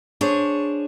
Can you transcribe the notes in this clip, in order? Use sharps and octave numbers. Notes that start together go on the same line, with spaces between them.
D4 G#4 C5 C#5